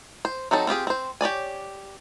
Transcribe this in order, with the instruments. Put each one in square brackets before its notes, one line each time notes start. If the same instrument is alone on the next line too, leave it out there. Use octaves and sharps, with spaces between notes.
[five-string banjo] C5
F#3 C4 D#4 A4
C4 F4 G4 G#4
C4 C5
G4 C#5 D5 G#5